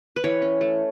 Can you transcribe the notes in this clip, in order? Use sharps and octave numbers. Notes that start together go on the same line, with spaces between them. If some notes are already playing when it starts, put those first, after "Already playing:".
B4
E3 C#5
C#4
A3